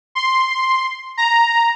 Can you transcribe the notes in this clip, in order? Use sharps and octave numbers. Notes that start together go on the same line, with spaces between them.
C6
A#5